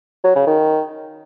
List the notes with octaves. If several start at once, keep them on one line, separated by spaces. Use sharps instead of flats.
F#3
C#3
D#3